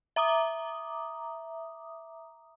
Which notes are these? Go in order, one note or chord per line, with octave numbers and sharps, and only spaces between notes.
E5 A#5 D6 D#6